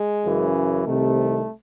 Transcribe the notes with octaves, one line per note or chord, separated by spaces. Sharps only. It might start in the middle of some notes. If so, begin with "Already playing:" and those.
Already playing: G#3
F#2 C#3 E3
C2 C3 D#3 A3